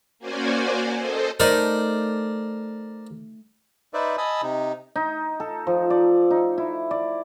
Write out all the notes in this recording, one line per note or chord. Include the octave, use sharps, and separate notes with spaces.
A#3 C#4 F#4 C5 D5 G#5
A4 C5 D#5
A3 D#4 A#4 C5 D5
D#4 B4 C5 D5 E5
D#5 G#5 A5 B5 D#6 E6
C3 D#4
D#4
A4
F3
D5
D#4
E4
D5